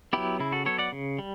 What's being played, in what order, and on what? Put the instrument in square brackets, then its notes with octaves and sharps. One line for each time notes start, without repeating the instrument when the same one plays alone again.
[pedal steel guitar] F#3 B3 E4 G4
C#3 E4
F#4 A4
F#3 B3 A4 C#5
D5 F#5
C#3
G3